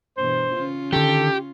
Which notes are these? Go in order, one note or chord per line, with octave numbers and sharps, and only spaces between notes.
G2 B2 E3 C5
C#3 C#4 F4
D3 D#3 G4 A4